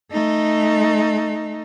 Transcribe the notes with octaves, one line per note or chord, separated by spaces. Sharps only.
A3 D#4